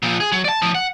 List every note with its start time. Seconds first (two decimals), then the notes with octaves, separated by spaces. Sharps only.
0.03 A#2 F3
0.20 G#4
0.32 F#3
0.45 D5 A5
0.62 A2 F3
0.75 F#5